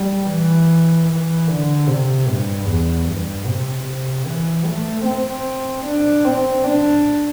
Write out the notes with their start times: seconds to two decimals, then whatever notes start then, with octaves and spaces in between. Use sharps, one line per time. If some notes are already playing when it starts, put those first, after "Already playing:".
Already playing: G3
0.29 E3
1.08 E3
1.48 D3
1.87 C3
2.28 G2
2.68 E2
3.06 G2
3.46 C3
3.86 C3
4.26 E3
4.66 A3
5.05 C4
5.85 D4
6.24 C4
6.64 D4